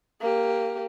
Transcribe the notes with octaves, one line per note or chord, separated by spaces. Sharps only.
A#3 G4